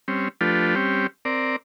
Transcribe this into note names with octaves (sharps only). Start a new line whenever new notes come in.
G3 C4 C#4
F3 A3 D4 F4 G4 B4
G3 C4 C#4 G4
C4 A#4 D5